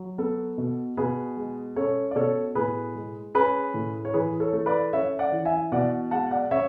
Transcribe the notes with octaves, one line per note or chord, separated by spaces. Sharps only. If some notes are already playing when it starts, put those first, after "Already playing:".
Already playing: F#3
B3 A4
B2
B2 G#4 B4
G#3
C#4 A4 C#5
D5
B2 A4 C#5
A2 G#4 B4
G#3
C#4 G#4 B4
A2
C#5
E3 G#4 B4
A4 C#5
A3
B4 D5
C#4 C#5 E5
D5 F#5
E3
E5 G#5
B2 D5 F#5
G#3 F#5 A5
D5 F#5
C#4 C#5 E5